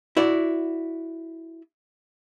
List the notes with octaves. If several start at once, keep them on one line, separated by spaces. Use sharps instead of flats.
E4 F#4 D5